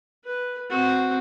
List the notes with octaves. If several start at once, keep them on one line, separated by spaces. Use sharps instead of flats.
B4
C4 F#4